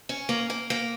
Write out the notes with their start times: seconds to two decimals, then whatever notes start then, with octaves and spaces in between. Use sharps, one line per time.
0.09 C#4
0.29 A#3
0.50 A#3
0.70 A#3